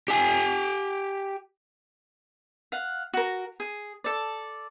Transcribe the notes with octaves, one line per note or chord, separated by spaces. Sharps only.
G4 G#5
F5 F#5
F#4 A#4
G#4
A4 D5